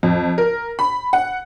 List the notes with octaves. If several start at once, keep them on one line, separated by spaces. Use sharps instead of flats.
F2
A#4
B5
F#5